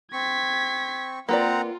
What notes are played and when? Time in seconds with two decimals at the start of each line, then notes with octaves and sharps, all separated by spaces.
0.13 C4 C#6 G#6 B6
1.29 A#3 C4 F4 B4 D5 F#5 A#5